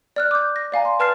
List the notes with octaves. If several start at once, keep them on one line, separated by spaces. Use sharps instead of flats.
D5 F6 F#6
D6 G6
A#6
D5 F5 G#5 A#5
C6
B4 A5 F6 A6 C7